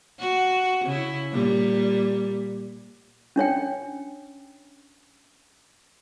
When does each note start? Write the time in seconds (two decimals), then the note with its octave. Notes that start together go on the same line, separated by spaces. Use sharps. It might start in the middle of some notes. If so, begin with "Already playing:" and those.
0.19 F#4
0.84 C#3 E4
1.32 A#2 G3
3.36 C#4 D4 C#5 G5